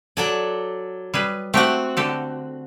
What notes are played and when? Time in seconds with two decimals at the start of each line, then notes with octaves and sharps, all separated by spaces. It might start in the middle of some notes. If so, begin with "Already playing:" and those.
0.17 F#3 A4 D5 G#5
1.14 G3 G#4 B4
1.54 A3 C4 F#4 G4
1.97 D3 G4 A4